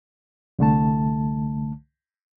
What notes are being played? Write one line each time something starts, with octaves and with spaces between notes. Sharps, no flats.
C2 D3 A3 A5